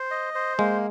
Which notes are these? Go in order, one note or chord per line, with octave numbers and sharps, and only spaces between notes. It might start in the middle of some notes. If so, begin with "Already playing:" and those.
Already playing: C5
D#5
C5
G#3 A#3